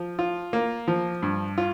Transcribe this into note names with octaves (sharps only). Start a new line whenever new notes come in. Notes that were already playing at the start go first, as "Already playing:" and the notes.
Already playing: F3
F4
A#3
F3
G2
F4